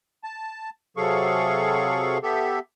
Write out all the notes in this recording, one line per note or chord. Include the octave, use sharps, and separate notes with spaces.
A5
C3 F#3 G#4 A4 F5 C#6
B3 G4 A4 E5